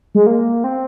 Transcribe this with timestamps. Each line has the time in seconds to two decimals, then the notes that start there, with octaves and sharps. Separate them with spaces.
0.15 G#3
0.27 A#3
0.64 C4